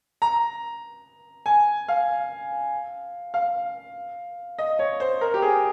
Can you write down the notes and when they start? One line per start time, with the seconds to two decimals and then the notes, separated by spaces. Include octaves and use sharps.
0.22 A#5
1.46 G#5
1.88 F5
3.34 F5
4.58 D#5
4.79 C#5
5.00 C5
5.21 A#4
5.34 G4
5.42 G#4